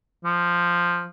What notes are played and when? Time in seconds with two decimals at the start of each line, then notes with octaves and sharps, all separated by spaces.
0.25 F3